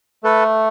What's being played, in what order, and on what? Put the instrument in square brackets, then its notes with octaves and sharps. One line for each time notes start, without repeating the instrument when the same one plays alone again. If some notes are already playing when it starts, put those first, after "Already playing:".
[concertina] A3 A4 B4